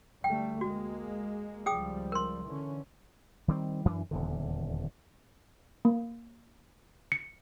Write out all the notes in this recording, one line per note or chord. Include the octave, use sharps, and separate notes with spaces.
D2 G3 A3 G5
G#3 A#3 F#4
C#2 F3 G3 G#4 G5 D#6
A#4 C6
D3 E3 C#4
D#3 G3 C4
F#2 E3 D4
D#1 E2 D3
A#3
C#7